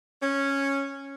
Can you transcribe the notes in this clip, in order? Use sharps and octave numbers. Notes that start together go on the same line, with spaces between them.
C#4